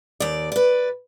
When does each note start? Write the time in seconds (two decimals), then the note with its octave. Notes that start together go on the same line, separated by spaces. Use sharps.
0.20 D#2 D5
0.52 B4 D5